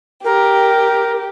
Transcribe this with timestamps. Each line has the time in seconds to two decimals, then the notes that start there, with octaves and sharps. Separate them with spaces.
0.25 G4 A#4